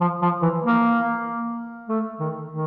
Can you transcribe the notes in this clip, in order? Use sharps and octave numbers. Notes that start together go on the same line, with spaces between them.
F3
F3
E3
A#3
A3
D#3
D#3